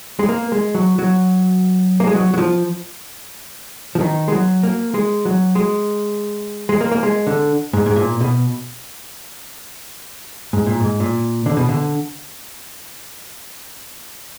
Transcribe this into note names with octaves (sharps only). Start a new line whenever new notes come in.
G#3
A#3
G#3
F#3
F#3
A#3
G#3
F#3
F#3
F3
F3
D#3
G#3
F#3
A#3
G#3
F#3
G#3
G#3
A#3
A#3
G#3
D3
G#2
G#2
A#2
B2
G#2
A#2
G#2
A#2
D3
B2
D3